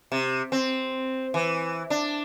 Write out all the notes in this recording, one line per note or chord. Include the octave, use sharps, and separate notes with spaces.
C3
C4
E3
D4